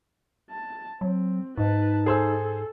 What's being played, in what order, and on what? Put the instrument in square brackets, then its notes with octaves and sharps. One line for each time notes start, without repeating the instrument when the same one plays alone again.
[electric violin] A5
[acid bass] F#3 [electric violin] C4
[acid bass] G#2 [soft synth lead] D#4 [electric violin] B4 A5
[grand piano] G#4 C5 E6 [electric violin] A4